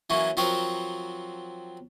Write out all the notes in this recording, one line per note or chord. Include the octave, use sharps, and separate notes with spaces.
E3 F#3 A#3 C#4
F3 F#3 C4 F#4 A#4 B4